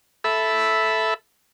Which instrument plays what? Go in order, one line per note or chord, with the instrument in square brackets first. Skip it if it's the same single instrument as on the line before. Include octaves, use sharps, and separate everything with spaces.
[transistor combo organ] A4 E5 B5